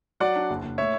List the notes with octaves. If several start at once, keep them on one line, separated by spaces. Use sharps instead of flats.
F#3 D5 F#5
D4
F#1
F#1
A2 C#5 E5